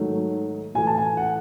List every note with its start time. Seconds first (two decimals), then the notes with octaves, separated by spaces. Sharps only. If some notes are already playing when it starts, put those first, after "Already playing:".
Already playing: G#2 D#3 F#3 A3
0.75 A2 E3 A3 G#5
0.87 A5
0.98 G#5
1.17 F#5